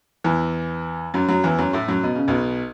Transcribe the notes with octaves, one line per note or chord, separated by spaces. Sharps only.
E2 E3
F#2 F#3
F#2 F#3
E2 E3
F#2 F#3
A2 A3
F#2 F#3
B2
C#3
B1 B2